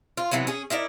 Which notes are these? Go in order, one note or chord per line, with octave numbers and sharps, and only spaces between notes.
F4
C3 E3 F#3 B3
C#4 G#4
D#4 E4 A#4 D5